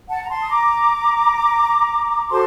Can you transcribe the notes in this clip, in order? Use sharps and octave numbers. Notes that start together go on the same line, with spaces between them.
F#5 A5
A#5
A5 C6
D#6
A#5 D6
F#4 A4 C5 A5 C6